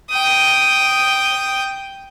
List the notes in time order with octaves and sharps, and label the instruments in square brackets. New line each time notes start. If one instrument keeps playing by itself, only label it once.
[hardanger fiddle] G5 D#6